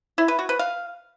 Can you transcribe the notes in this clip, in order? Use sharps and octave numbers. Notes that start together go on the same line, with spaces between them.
E4
B4
F#4
B4
F5